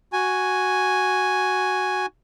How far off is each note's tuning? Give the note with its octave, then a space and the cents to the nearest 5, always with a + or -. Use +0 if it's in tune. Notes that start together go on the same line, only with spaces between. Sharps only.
F#4 +0 G#5 +0